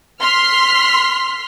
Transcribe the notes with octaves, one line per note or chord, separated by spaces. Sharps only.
C6 F6 B6